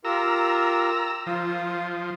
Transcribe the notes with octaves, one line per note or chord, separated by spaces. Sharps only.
F4 G4 A#4 A#5 E6
F3 F4 D#6